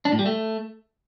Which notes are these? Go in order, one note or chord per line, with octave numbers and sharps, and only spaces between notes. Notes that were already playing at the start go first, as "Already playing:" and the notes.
D4
A2
G3
A3